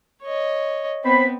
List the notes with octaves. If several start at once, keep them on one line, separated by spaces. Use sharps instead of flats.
C#5 D#5
B3 C4 C5 B5